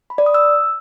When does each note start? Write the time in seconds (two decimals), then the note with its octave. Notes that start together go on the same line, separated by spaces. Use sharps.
0.10 B5
0.18 D5
0.26 D#6
0.34 E6